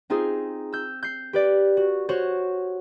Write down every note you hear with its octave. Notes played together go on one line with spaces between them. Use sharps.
C4 D#4 F4 G#4 C5
E6 G6
G6 C7
G4 B4 D5
F#4
F#4 C5 C#5